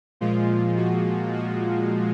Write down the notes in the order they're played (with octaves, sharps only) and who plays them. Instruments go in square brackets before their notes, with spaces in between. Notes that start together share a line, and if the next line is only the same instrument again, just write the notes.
[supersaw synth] A#2 F3 G#3 F4
F#4
F#4